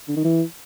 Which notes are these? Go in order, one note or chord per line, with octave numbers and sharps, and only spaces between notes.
D3
D#3
E3